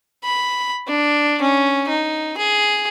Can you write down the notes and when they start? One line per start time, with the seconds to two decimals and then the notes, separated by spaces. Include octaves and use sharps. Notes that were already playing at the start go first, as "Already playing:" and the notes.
0.24 B5
0.88 D4
1.41 C#4
1.89 D#4
2.37 G#4